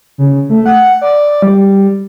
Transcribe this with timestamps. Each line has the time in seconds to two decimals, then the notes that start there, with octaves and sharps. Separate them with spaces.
0.18 C#3
0.50 A3
0.66 F#5
1.01 D5
1.42 G3